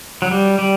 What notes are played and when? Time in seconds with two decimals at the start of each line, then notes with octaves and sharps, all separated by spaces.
0.22 F#3
0.31 G3
0.59 G3